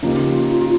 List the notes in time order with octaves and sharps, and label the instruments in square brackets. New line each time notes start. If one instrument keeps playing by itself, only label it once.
[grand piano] C#3 F3 A#3 D#4 G4 [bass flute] F4